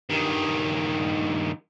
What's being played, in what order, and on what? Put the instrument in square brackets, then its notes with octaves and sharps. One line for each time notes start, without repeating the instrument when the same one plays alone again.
[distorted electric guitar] G2 D#3